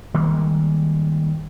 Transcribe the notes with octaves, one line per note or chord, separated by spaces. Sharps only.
D#3 G3 G#3 A#3